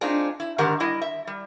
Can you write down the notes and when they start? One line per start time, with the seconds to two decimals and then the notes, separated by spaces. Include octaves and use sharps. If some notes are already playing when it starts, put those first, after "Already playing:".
0.01 G#3 C4 D4 D#4 F4
0.40 E4
0.58 G#2 D3 D#3 G4 A#4 F#5
0.80 G3 E4 D#5
1.02 E5
1.27 G3